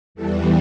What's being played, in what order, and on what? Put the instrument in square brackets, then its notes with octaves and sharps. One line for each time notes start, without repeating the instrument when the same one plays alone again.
[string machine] E2 E3 G3 A4